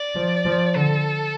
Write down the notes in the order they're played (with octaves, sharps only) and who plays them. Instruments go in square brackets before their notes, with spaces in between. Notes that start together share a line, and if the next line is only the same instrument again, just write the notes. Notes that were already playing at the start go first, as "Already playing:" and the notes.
Already playing: [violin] D5
[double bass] F3
F3
[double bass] D3 [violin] A4